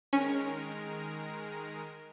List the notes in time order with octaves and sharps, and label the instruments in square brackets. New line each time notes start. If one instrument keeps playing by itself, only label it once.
[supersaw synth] D#3 G#3 A#4 [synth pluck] C#4